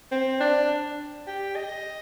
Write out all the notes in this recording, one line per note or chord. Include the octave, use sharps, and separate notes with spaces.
C4
D4
G4
D#5